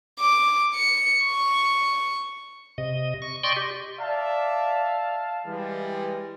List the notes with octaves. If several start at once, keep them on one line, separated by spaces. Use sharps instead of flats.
D6
C#7
C#6
C3 D#5
C#6
D5 D#5 G5 C6 C#6
G4
D5 E5 F5 A5
E3 G3 G#3